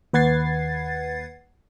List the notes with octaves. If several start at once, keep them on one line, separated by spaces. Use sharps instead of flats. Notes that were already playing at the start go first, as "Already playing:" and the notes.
D#2 B4 F#5 G#6 A6 C7